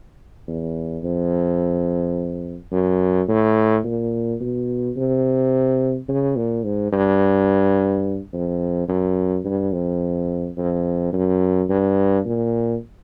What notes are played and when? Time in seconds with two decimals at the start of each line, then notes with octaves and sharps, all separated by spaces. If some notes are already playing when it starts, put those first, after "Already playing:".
0.47 E2
1.03 F2
2.71 F#2
3.28 A2
3.84 A#2
4.40 B2
4.96 C3
6.08 C#3
6.36 A#2
6.65 G#2
6.92 G2
8.33 F2
8.89 F#2
9.45 G2
9.73 F2
10.57 F2
11.13 F#2
11.69 G2
12.25 A#2